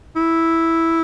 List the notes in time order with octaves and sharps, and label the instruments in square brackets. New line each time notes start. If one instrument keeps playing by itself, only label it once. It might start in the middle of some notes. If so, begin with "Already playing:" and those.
[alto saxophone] E4